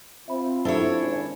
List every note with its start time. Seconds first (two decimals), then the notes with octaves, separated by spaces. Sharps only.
0.28 C4 F4 E5 B5
0.65 C3 F#3 D4 E4 F4 A4 C5 C#5
0.99 G#1 C#4